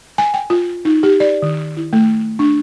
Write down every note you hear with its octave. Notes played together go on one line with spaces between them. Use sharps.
G#5
G5
F4
D#4
G4
D5
D#3
E4
A3
D4